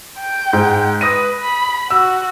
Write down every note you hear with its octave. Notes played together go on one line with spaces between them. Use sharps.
G5
G#2
B4 D#6 A#6 D#7
B5
F#4 E6